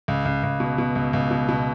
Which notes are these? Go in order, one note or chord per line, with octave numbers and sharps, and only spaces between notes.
C#2
C#2
C#2
B2
B2
C#2
C#2
B2
B2